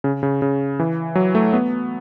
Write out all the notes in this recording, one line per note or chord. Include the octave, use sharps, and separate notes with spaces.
C#3
C#3
C#3
E3
F#3
A3
B3